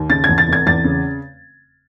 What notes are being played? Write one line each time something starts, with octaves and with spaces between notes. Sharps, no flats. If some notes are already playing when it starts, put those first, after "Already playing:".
Already playing: D#2
C#3 A6
G#6
E2
A6
F1 G#6
E2 A6
C#3